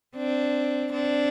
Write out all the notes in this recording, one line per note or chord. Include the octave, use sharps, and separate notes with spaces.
C4 D4
C4 D4